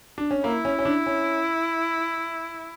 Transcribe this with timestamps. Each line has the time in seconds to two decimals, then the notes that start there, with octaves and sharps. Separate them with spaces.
0.18 D4
0.31 C#4
0.44 A#3 E4
0.65 C#4
0.79 C#4
0.85 D4
1.06 C#4